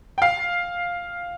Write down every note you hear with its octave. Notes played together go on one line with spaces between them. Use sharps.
G5
F5